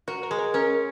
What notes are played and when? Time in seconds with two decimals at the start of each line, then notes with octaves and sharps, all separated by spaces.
0.08 F#4 A#4
0.23 A#4
0.31 G#3
0.39 A#4
0.54 C#4 A#4